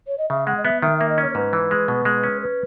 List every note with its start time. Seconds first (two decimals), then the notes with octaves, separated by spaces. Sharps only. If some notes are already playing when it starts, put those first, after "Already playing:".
0.07 C#5
0.18 D#5
0.30 C#3 E5
0.47 G#3 F#5
0.57 D#5
0.64 B3 E5
0.82 D#3 E5
0.98 A#3 E5
1.09 D#5
1.18 C#4 C#5
1.31 C#5
1.35 G#2 B4
1.53 E3
1.71 G#3
1.88 B2
2.05 G#3
2.23 C#4
2.42 B4